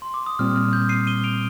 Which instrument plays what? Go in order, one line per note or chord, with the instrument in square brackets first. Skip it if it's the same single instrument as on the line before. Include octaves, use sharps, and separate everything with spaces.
[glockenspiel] C6
D6
D#6
[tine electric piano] A#2 G3 C4 [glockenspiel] F6
[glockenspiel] F6
G6
C7 D#7
D#7 G7
D7 F7